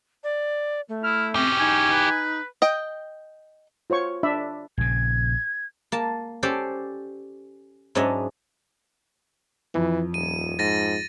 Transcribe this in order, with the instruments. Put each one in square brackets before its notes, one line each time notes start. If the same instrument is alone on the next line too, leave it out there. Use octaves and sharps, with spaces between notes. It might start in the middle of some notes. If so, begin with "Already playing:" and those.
[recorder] D5
A3
[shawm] E4 [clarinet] F6
[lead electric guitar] E3 G4 [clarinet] C4 [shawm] C#4
[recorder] D#4 [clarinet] G#5
[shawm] B4
[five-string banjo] D#5 G5
[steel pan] F4 C5 C#5 C#6
D4 D5 E5 B5
[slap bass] A#1 C#3 [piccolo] G#6
[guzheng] A#3 A5
C#4 G4 A4 C5 D5
G#2 F#3 C#4 D4 D#5 E5
[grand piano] F2 [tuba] E3
[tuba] D#1 [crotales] D#7
[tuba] G#2 [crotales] A6 A#6 D#7